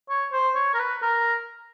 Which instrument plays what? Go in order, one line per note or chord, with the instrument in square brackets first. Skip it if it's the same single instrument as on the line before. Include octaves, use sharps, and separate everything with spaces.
[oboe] C#5
C5
C#5
A#4
B4
A#4